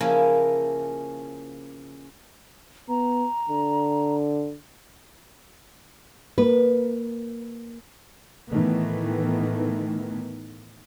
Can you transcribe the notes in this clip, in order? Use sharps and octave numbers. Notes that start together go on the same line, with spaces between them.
C#3 F3 A#3 C#4 E4
B3 A#5
D3
A#3 A#4 B4
A2 D#3 E3 A3 B3